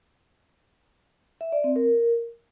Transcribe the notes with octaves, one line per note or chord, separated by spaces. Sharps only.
E5
D5
C4
A#4